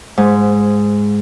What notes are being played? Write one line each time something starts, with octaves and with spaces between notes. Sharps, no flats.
G#2